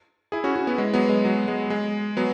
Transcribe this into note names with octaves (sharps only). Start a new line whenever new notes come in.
E4 G#4
C#4 F#4
C#4 F#4
B3 E4
G#3
F#3 B3
G#3
F#3
G#3
G#3
F#3 B3